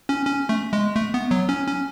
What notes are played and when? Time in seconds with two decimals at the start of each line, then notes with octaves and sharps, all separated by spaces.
0.09 C#4
0.26 C#4
0.49 A3
0.73 G#3
0.96 A3
1.14 B3
1.31 F#3
1.49 C#4
1.67 C#4